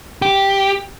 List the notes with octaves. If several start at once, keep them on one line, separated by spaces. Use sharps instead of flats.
G4